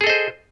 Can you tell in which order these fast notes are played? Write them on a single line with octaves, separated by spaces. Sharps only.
G#4 A4 D#5 C5